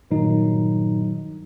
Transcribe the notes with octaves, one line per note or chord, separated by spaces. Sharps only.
G2 A#2 D#3 F#3 D#4